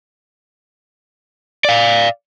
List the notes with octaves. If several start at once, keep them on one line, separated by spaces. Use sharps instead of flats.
D5 F5